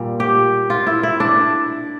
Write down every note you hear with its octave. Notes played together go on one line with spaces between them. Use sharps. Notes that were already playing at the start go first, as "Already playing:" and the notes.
Already playing: A#2 G3
G4
F4
E4
E4
D4